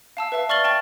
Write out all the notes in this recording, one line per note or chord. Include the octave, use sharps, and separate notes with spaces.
F5 A5 E6
B4 E5 F5 A5
D5 C#6 F6 A6 F#7 G7
G5 A5 C#6 A6